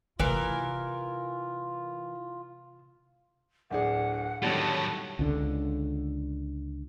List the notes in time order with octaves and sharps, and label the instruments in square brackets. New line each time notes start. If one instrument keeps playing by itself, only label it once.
[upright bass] C3 A3 [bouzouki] E3 A#4 [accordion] F4
[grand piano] D1 D4 G#4 [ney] F#5
[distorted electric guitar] A2 F#3 [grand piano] D3 D#3 G3 [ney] A5
[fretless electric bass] C#2 D3